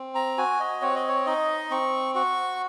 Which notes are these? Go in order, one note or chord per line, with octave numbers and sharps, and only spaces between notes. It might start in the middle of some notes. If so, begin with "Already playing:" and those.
Already playing: C4
A#5
F#4 G#5
D#5
C4 C#5
D#5
C#5
D#4 D#5
C4 C#6
F#4 C#6